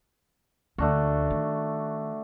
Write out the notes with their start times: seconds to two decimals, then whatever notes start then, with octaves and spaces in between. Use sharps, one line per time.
0.78 D2 A3 D4 F#4
1.30 D#3